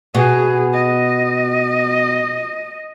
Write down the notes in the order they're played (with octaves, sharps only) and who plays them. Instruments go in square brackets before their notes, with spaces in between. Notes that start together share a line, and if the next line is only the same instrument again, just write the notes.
[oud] B2 [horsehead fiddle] G#4
[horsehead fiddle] D#5